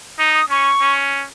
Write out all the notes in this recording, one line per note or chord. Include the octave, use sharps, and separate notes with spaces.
D#4 D#6
D#6
C#4 C#6
C#4